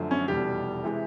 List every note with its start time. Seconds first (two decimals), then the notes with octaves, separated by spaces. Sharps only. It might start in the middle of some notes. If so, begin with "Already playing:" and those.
Already playing: F#2 D3 F3 A3
0.11 C#4
0.28 F1 E2 B2 G3 G4
0.84 C3 E3 G#3